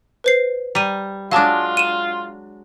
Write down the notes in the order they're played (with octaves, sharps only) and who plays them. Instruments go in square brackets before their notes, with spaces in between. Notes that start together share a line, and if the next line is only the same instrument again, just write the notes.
[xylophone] B4 C5 C7
[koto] G3 [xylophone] A#5 D#7
[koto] F#3 G#3 D4 [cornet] F4 [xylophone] F5 A5 D6
[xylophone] D#7 E7